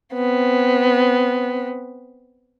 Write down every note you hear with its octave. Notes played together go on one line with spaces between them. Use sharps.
B3 C4